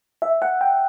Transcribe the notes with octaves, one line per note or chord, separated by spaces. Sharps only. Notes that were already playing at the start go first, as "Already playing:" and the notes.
E5
F#5
G5